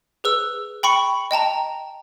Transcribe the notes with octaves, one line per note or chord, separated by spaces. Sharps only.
G#4 B4 E6
G5 B5 C#6 C#7
D#5 G5 A5 A#5